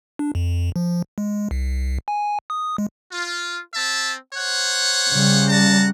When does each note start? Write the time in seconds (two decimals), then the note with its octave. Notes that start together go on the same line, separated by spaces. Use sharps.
0.19 D4
0.35 F2
0.76 F3
1.18 G#3
1.51 C2
2.08 G#5
2.50 D#6
2.78 G#3
3.11 F4
3.74 C4 E5 A5
4.35 C5 C#5 F#5
5.11 C#3 G3
5.50 F#5 A5 A#5